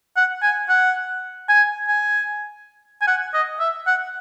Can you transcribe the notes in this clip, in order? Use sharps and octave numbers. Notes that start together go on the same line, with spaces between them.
F#5
G#5
F#5
G#5
G#5
G#5
F#5
D#5
E5
F#5